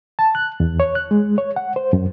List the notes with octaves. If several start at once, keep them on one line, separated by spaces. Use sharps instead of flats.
A5
F#6
E2
C#5
F#6
G#3
C#5
F#5
C5
F#2